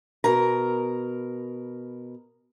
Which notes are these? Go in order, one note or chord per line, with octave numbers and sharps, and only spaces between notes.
B2 A#4 A#5